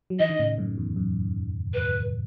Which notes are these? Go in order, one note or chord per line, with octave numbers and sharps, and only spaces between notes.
F#3
E3 D#5
D#3
A2 C#3
F#2 A2
E2
F#2
B4